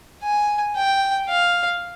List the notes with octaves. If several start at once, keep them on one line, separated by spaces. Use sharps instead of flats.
G#5
G5
F5